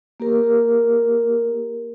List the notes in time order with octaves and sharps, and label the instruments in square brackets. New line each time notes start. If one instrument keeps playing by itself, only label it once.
[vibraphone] A#3 G4 A#4